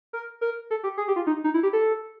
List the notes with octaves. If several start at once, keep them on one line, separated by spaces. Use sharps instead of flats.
A#4
A#4
A4
G4
G#4
G4
F4
D#4
D#4
E4
G4
A4